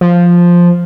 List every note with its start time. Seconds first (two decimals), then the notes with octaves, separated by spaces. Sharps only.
0.01 F3